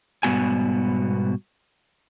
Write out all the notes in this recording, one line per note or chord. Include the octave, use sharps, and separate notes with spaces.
G#2 B2 G3 B3 F#4 G#5